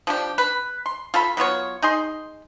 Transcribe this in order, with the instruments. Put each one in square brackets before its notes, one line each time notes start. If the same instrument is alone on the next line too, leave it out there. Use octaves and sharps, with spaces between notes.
[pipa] F3 D4 G4
B4
C6
F4 A4 B5
F#3 B3 F4 C#5
D#4 G#4 C6